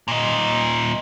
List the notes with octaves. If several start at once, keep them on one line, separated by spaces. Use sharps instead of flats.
A#2 D#4